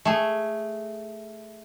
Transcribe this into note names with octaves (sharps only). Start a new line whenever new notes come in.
A3 G#4